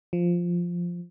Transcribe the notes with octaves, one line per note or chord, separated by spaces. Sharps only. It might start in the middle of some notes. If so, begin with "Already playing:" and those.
F3